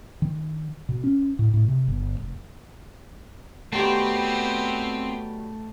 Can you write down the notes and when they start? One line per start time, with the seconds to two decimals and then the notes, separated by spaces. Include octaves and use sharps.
0.22 D#3
0.89 B2
1.04 C#4
1.39 A2
1.54 A2
1.68 C3
1.88 G1
2.22 F1
3.73 D#3 F#3 G3 A3 B3 C4 G4 C6